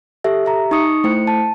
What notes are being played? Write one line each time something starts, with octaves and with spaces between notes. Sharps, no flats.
G4 A4 E5
G4 E5 A#5
D#4 C#6 D#6 C#7
A3 E4 C5 G5 C#7
A5